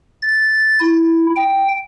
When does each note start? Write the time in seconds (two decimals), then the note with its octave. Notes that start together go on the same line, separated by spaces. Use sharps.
0.22 A6
0.80 E4
1.36 G5